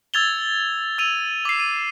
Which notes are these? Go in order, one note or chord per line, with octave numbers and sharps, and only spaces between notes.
E6 G#6 A6 F7 G7
E6 D#7 F7
D6 C7
D#7